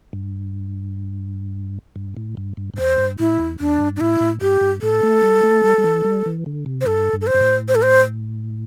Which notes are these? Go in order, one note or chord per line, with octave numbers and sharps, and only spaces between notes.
G2
G2
A2
G2
G2
G2
E2 C5
G2
A2 E4
E2
E2 D4
G2
D4
A2 E4
A2
G2 G4
G2
A2 A4
A3
G3
A3
G3
G3
E3
G3
E3
D3
C3
C5
G2 A4
G2
A4
C5
G2
A2
C5
A4
C5